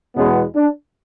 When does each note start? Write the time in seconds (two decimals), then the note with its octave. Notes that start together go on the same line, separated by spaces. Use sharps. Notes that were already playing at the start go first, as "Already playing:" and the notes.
0.16 E2 B2 G#3 B3 C#4
0.55 D4